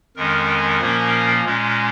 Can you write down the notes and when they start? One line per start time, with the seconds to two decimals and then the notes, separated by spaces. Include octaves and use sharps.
0.16 F2 D#3 G#3 C#4 A#4
0.80 A#2 F3 A#3 C#4
1.45 A#2 G#3 C#4